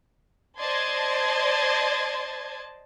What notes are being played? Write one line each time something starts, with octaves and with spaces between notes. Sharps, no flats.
C5 D5 D#5 A5 C6 G#6